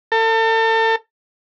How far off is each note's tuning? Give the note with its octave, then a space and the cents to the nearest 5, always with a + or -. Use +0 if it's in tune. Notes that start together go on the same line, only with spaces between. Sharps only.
A4 +35